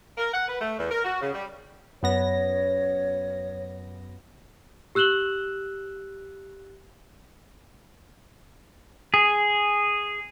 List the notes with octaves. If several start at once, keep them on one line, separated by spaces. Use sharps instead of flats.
A#4
F#5
B4
A3
E2
A#4
F#4
C#3
G3
F#2 B3 C#5 A#6
G4 E6 F#6 E7 F#7 G7
G#4